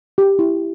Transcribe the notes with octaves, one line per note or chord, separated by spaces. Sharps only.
G4
E4